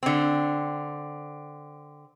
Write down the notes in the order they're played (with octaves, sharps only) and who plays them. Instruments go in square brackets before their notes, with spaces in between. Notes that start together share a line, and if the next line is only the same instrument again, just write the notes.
[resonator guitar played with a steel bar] D3 C4